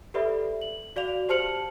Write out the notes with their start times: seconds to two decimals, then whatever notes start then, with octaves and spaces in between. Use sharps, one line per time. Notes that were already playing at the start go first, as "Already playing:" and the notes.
0.14 G4 A4 B4 D5 E5 B5
0.62 F#7
0.96 F#4 D5 F5 F7
1.29 G4 C5 A5 F6 C#7 F#7